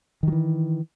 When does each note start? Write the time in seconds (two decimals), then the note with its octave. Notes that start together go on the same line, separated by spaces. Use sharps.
0.23 D#3
0.28 F#3
0.32 E3